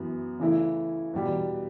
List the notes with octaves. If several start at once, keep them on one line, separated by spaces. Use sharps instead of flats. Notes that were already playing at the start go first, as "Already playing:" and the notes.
Already playing: F#2 E3 B3
C#3 E3 A3 E4
E2 B2 G3